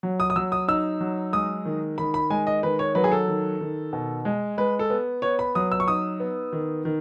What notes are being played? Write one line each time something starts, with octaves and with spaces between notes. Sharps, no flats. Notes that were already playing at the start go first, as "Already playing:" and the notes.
F#3
D#6
D#6
F#3 E6
D#6
D#4 E6
F#3
G#3 D#6
D#3
D#3 B5
B5
G#3 G#5
D#5
D#3 B4
C#5
F#3 B4
G#4
A4
D#3
D#3
B2
G#3
G#3 B4
A4
B3
B3 C#5
B5
F#3 D#6
E6
C#6
D#4 D#6
B3
D#3
D#3